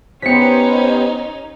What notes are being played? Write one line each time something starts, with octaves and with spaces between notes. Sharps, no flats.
B3 C#4 D#4 G4 C5 B6 C#7